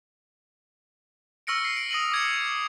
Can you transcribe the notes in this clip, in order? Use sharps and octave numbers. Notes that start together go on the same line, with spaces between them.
C#6 E6 F6 A#6 C#7 D7
C7
D7
D#6 A#6 D#7 F#7
D6 G#6 C#7